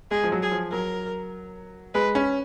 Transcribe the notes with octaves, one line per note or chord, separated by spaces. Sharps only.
G#3 G#4
F3
F#3
G#4
F3
F#3 A#4
G#3 B4
C#4